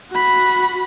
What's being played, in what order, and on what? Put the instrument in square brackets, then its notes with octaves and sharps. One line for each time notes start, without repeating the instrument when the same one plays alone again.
[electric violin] F#4 B5